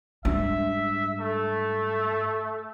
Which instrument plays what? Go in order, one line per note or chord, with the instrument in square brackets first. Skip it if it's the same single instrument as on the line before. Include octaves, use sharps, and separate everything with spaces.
[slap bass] G#2 G3 [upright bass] D4 [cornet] E5
[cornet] A3